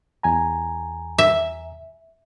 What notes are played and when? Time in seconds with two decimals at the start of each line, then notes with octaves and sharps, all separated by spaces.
0.23 E2 G#5 A#5
1.18 E5